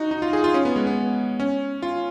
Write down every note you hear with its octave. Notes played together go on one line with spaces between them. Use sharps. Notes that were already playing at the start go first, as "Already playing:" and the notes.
Already playing: D#4 F#4
D#4
F4
G#4
F4
C#4
B3
G#3
B3
C#4
F4